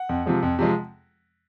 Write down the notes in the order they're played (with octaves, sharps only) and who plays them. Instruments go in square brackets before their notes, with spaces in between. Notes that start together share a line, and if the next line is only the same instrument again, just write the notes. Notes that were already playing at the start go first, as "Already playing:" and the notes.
Already playing: [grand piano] F#5
F2
C3 F3 G#3
F2
C3 F3 G#3